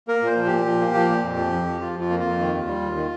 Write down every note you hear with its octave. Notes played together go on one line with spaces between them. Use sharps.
A#3 A#4
A#2 C5
F3
A#2 G4
F3
A#3
F3
A#2
F2
F3
F2
F3
F3 F4
F2 F4
A#3
F2 F4
D#3
D#2
G3
D#2
D#3